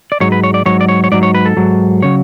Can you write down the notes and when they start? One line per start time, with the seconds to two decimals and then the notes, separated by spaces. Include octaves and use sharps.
0.12 D5
0.20 G#2 F#3 C#5
0.32 B4
0.44 C#5
0.54 D5
0.66 G#2 F#3 C#5
0.81 D5
0.89 C#5
1.04 C#5
1.12 G#2 F#3 D5
1.23 C#5
1.35 B4
1.45 A4
1.57 G#2 F#3
2.03 C#3 F#3 C#5